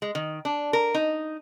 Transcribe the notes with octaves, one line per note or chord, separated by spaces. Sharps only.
G#3
D#3
D4
A#4
D#4